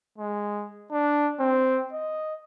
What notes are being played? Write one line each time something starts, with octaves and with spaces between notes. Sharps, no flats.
G#3
D4
C4
D#5